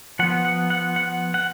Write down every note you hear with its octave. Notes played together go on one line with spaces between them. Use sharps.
F3 B3 F#5
F#5
F#5
F#5
F#5